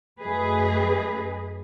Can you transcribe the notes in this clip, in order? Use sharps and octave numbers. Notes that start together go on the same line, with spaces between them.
F#2 A3 G#4 B4 D#5